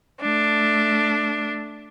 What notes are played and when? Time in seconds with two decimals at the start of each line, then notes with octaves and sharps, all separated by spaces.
0.21 A3 D4